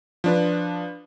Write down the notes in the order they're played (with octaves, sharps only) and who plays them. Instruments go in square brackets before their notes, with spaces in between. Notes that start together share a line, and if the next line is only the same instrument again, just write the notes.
[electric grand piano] F3 D4 B4